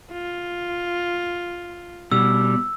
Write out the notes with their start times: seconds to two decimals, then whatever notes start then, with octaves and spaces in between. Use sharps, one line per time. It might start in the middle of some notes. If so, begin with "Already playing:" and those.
0.12 F4
2.12 B2 G3 E6